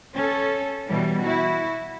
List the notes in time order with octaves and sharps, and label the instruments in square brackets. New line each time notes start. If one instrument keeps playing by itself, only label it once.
[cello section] C#4 A4
B2 E3 G3
E4 F#4